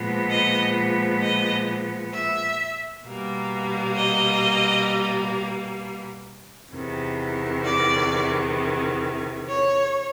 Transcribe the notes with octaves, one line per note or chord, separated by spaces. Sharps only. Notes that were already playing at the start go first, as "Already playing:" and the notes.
Already playing: A#2 F3 G#3 B3
D#5
D#5
E5
B2 G3 A#3
D#5
E2 C3 D#3
D5
C#5